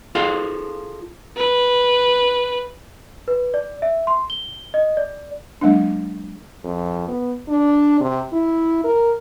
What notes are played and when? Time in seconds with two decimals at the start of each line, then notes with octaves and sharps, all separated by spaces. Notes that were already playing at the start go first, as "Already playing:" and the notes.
0.15 F4 G#4 A4 F5
1.37 B4
3.28 B4
3.54 D5
3.82 E5
4.07 C6
4.30 G7
4.74 D#5
4.97 D5
5.61 F#3 G#3 A#3 D4
6.64 F2
7.09 B3
7.48 D4
8.00 C3
8.33 E4
8.84 A#4